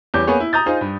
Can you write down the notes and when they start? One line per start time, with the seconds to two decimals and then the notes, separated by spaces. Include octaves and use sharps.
0.14 E2 G3 C#4 D6 G6
0.27 A#3 B3 C#4 G#4 C#5
0.40 E4
0.53 A#5 D#6 G6 A6
0.66 D#4 F4 G#4 C5
0.81 G2